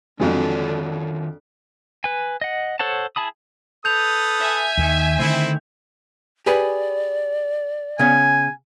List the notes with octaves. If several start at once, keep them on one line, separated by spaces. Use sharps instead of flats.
F2 D3 D#3 F#3 G#3 D4 F4 C#5
B4 G#5
D#5 F#5
A4 C5 C#5 F#5 A5
E4 G#4 A5 B5 D#6
A4 B4 D#6 G6 F7
E5 G#5
D#2 D#3
D3 D#3 A3 C4 E4
G4 G#4 B4 D5
C#3 B3 C#4 G#5